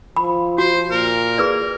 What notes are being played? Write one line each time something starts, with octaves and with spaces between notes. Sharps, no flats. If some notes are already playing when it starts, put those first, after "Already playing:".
F3 B5
F#4 C5
A#2 A#4
G#4 B4 D5